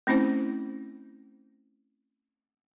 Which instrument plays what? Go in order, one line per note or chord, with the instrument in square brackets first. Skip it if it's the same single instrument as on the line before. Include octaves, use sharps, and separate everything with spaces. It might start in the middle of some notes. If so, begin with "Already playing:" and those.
[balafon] A3 C4 C#4 E4 C5